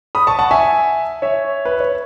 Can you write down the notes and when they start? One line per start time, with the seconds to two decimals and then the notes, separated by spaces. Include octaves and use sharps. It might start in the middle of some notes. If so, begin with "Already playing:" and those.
0.15 B5 D#6
0.27 A5 C#6
0.39 F#5 A5
0.51 E5 G#5
1.22 C#5 E5
1.65 B4
1.80 C#5